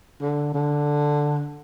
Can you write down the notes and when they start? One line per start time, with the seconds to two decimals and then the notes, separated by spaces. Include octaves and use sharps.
0.21 D3
0.54 D3